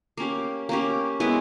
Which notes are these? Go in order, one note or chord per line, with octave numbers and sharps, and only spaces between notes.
A#3 C#4 G4
A#3 C#4 G4
G#3 B3 E4